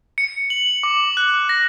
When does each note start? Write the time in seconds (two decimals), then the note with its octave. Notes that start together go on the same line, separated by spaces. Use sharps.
0.18 C#7
0.50 F#7
0.83 D6
1.17 F#6
1.49 A#6